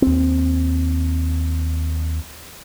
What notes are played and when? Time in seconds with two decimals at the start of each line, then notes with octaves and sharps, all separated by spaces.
0.02 D#2 C4